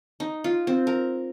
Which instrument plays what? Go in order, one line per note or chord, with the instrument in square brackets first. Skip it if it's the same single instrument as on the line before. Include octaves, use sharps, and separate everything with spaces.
[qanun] D#4
F4
C4
A#4